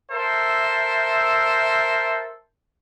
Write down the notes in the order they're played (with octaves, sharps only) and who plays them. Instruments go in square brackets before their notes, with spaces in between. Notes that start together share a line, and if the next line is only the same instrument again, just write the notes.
[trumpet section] A4 A#4 C5 E5